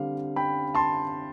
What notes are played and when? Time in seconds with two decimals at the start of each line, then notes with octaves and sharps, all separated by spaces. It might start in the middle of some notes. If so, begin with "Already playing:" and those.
Already playing: D3 G3 C4 F5
0.36 G5 B5
0.75 A5 C6